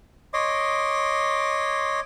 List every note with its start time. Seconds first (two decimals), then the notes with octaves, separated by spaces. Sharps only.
0.33 C#5 D#5 C6 D6